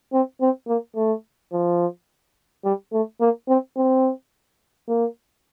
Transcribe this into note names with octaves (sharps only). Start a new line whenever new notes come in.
C4
C4
A#3
A3
F3
G3
A3
A#3
C4
C4
A#3